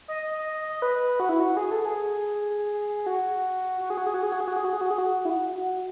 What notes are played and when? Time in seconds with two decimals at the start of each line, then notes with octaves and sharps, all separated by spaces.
0.08 D#5
0.82 B4
1.20 F#4
1.29 E4
1.40 F#4
1.57 G#4
1.71 A4
1.85 G#4
3.06 F#4
3.81 F#4
3.90 G#4
3.97 F#4
4.07 G#4
4.14 F#4
4.23 G#4
4.32 F#4
4.41 G#4
4.48 F#4
4.56 G#4
4.65 F#4
4.73 G#4
4.81 F#4
4.91 G#4
4.98 F#4
5.25 E4
5.30 F#4
5.55 F#4